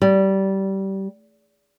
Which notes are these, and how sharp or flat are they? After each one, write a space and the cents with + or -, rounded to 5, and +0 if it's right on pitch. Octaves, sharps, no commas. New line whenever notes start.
G3 -20